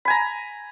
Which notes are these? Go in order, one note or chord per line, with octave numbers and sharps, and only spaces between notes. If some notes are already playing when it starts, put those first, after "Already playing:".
G#5 A#5 B5